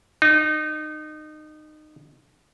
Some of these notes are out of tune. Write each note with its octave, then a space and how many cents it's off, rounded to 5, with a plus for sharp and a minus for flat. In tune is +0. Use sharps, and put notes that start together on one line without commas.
D#4 -25